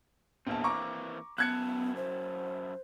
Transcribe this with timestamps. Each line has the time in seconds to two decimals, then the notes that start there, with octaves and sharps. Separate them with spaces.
0.47 A#1 E2 E3 A#3 C4 A5
0.64 A#5 C#6 D6
1.38 F#2 B3 E4 A5 F#6 G#6 C#7
1.96 C5